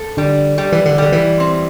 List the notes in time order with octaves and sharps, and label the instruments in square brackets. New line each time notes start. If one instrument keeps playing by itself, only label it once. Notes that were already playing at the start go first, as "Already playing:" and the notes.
Already playing: [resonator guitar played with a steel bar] A4
[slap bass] D3 [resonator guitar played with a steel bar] G3
[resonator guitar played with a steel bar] G3
[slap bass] E3
D3
[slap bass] D3 [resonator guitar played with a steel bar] G3
[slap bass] E3
[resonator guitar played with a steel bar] C4